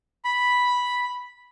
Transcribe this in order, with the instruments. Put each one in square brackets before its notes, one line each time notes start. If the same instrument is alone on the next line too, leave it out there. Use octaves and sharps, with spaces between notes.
[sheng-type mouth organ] B5